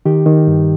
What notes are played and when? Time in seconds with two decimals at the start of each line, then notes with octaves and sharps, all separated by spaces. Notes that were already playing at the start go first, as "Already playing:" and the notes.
0.05 D#3 G4
0.26 D#3
0.47 G2